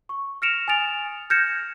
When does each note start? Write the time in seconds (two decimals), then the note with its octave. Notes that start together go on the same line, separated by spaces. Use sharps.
0.09 C#6
0.42 F6 A#6 C#7 D7 E7 F7
0.68 G#5 D#6 F6 A6 D7 F7
1.30 F6 G6 G#6 A#6 C#7 E7